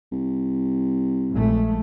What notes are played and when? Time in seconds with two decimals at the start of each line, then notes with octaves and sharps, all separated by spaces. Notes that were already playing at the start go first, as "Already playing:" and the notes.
0.12 C2
1.32 A#1 G#3 A3